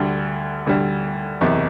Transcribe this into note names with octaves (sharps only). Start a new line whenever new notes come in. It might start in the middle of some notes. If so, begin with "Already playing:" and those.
Already playing: D2 D3 G3
D2 D3 G3
F#1 E2 C3